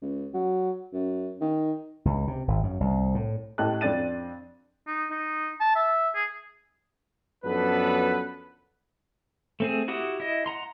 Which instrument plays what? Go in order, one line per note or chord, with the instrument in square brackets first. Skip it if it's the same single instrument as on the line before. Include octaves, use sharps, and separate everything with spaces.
[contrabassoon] C#2
F#3
F#2
D#3
[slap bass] C#2
C3
G#1
F#2
C2
A2
[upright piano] A2 G4 D#5 A5 F#6
F2 C4 D4 A6 D#7
[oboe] D#4
D#4
A5
E5
G#4
[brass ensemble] F#2 F3 B3 D4 A4 B4
[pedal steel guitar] A3 C4 G#4
E4 F#4 G4 F#5 D#6
E4 D#5
F#5 A#5 C6